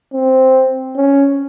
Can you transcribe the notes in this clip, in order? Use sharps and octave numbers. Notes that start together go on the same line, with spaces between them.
C4
C#4